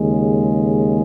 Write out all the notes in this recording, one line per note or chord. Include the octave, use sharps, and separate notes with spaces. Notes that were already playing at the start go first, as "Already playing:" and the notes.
Already playing: D#2 C#3 G#3